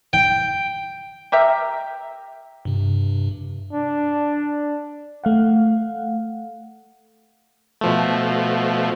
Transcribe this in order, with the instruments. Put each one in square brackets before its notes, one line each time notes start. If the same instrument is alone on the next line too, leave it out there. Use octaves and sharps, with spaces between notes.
[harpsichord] G5
[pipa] G4 A#4 E5
[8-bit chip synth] G2 C3
[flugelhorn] D4
[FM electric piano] A3 F5 F#5
[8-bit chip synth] B2 F3 A3